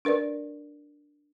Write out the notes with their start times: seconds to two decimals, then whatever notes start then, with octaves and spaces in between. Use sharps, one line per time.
0.05 D4 A#4 B4 D5